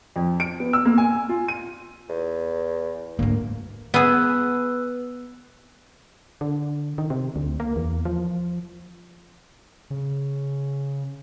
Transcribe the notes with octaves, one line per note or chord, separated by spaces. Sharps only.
F2
D7
B3
E6
A#3
G#5
F4
D#7
E2
D2 G#2 A3 A#3
B3 G#4 B4 E6 F#6
D3
D#3
C3
D2
A#3
E2
F3
C#3